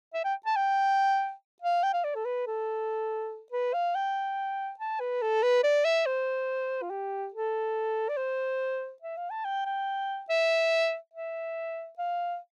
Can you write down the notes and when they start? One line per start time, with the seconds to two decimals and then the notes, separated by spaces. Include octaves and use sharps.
0.14 E5
0.25 G5
0.46 A5
0.56 G5
1.62 F5
1.83 G5
1.94 F5
2.04 D5
2.15 A4
2.25 B4
2.47 A4
3.52 B4
3.74 F5
3.95 G5
4.79 A5
5.00 B4
5.22 A4
5.43 B4
5.64 D5
5.85 E5
6.06 C5
6.82 F4
6.90 G4
7.34 A4
8.09 D5
8.17 C5
9.02 E5
9.17 F5
9.30 A5
9.45 G5
9.66 G5
10.29 E5
11.14 E5
11.98 F5